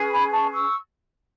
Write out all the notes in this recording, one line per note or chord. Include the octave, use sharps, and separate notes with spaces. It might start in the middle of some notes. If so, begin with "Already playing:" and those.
Already playing: C#4 G#4 B4
G#5 B5
A5 C#6
C#6 E6